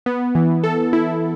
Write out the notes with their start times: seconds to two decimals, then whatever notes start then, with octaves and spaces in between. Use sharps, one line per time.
0.06 B3
0.35 E3
0.64 A4
0.93 E4